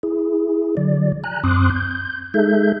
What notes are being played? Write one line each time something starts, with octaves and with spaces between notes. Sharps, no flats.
E4 G#4
D3 F#3 D5
G#5 A#5 F#6
F#2 C4 C6 D6 D#6 F#6
G6
G#3 D#4 G#4 A4 E5 G6